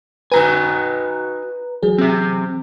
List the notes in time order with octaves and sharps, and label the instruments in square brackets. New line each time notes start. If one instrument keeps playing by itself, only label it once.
[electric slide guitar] D#4 F#4 G#5 [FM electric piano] B4 A#5
[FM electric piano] E3 F#3 G#4
[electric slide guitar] C4 G4